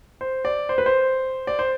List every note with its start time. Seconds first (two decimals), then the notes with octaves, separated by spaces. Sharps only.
0.21 C5
0.45 D5
0.69 C5
0.78 B4
0.86 C5
1.47 D5
1.59 C5